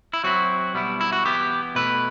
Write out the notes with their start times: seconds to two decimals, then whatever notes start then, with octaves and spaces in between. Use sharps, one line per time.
0.13 E4
0.24 F#3 C4 E4 F#4
0.74 B2 G3 B3 E4
1.01 E4
1.12 F#4
1.25 E3 B3 E4 G4
1.75 B2 A3 E4 B4